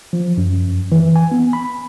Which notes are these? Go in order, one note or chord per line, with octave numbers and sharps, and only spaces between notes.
F3
F#2
E3
G#5
B3
B5